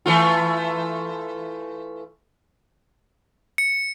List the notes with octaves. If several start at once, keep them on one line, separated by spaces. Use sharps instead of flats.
E3 A3 F4
C#7